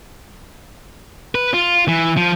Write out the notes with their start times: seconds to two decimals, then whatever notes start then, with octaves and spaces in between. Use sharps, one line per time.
1.35 B4
1.54 F4
1.88 E3
2.17 F3